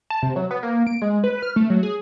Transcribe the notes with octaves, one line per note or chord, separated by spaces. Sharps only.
A5
C3
F#3
B3
A#3
D7
G#3
B4
F6
A3
F#3
G#4